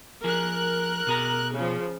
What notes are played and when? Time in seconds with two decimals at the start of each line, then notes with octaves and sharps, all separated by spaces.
0.24 F3 G#4 A#4 F#6
1.07 B2 G#4 A#5
1.54 C#3 F3